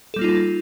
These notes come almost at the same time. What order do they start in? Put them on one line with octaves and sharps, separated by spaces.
A4 G3 A#3 F4 D#4